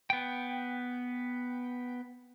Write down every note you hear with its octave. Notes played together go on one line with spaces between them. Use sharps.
B3 G5